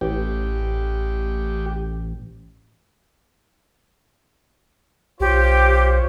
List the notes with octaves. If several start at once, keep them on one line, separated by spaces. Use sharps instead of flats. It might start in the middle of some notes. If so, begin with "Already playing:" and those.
A1 G4
B1 F4 G4 C5 C#5